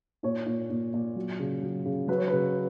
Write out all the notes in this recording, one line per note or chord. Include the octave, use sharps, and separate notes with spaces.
A#2 C#5
A#2
A#2
A#2
F#3
C#3
F#3
C#3
F#3 B4
C#5
C#3 B4